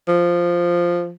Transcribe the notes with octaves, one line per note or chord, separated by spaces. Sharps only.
F3